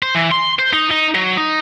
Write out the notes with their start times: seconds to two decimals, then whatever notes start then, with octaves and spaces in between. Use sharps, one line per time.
0.02 C5
0.15 E3
0.31 C6
0.59 C5
0.73 D#4
0.91 D#4
1.15 F#3
1.38 D#4